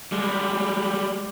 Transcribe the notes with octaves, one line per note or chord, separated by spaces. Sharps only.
G3 G#3